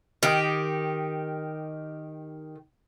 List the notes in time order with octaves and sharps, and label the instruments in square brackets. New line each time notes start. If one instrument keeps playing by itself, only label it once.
[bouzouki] D#3 G4